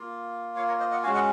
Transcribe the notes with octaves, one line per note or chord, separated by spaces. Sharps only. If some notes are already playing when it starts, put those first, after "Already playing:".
Already playing: A#3 F4
C#5 F5
A#4 C#5
C5 D#5
D#5 F#5
G#3 C#4 F#4 F5 G#5
D#5 F#5